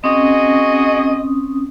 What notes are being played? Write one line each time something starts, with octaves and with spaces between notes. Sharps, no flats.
C4 C#4 F#4 G#4 D#5 D#6